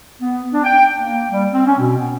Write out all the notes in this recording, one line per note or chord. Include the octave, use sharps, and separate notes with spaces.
B3
D4
G5
A#3
G3
C4
C#4
B2
B3